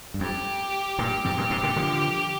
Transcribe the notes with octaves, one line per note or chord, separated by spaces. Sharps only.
G2
F2 G4
G2 A#2
F2 G#2 G4
G2 A#2
G#2 C3
A#2 D3
D3 F3